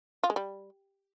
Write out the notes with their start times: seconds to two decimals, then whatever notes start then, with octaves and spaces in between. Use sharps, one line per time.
0.23 F4
0.30 G#3
0.36 G3